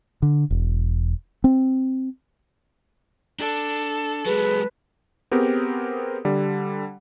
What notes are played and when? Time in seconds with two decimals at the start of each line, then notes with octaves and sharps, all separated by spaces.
0.22 D3
0.50 E1
1.44 C4
3.39 D4 A4
4.26 F#3 G#3 G#4 B4
5.31 B3 C4 G4 G#4 A#4
6.25 D3 G3